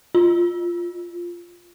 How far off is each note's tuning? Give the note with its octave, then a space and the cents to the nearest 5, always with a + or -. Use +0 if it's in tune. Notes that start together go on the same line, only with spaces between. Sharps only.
F4 +0